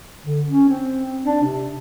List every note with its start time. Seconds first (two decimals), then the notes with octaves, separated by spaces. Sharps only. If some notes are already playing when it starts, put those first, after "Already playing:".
0.24 D3
0.47 C#4
0.68 C4
1.25 D4
1.43 C3